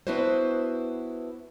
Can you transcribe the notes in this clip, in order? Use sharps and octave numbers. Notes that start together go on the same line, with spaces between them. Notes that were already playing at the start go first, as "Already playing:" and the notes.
B3 D4 E4 F#4 B4 C5